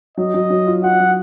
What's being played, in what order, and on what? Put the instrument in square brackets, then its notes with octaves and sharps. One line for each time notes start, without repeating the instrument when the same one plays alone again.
[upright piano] F#3 [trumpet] D#5
[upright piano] F#3
F#3
F4
[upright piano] F4 [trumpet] F#5
[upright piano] F#3